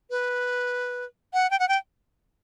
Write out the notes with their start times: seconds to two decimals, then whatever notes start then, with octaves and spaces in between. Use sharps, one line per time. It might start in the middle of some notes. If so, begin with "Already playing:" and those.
0.10 B4
1.34 F#5
1.51 G5
1.59 F#5
1.69 G5